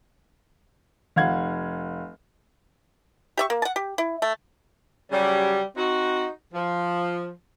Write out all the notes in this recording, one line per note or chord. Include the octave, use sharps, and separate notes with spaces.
F1 F5 F#5 G#6
G4 E5 C#6
A#3
F#5 A5
G4
E4
A3
C#3 F#3 G3
C4 D#4 F#4
F3